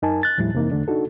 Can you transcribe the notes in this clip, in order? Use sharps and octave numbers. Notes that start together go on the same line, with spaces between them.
F#2 D#4 A#4 G#5 A5
F#6 A6
D#2 A2 F3 G3 E4
F2 C3 E3 A#3 D#4
E2 D3 A3 D4
D4 D#4 F#4 A4